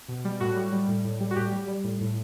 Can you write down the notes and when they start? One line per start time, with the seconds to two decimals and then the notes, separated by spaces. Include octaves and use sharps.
0.08 B2
0.25 G3
0.40 A2 F#4
0.56 G3
0.73 G3
0.88 A2
1.04 A2
1.20 G3
1.31 F#4
1.36 A2 G4
1.52 G3
1.68 G3
1.84 A2
2.01 A2